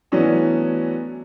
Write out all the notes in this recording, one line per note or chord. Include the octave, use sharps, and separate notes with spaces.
E3 F#3 A3 B3 C#4 D4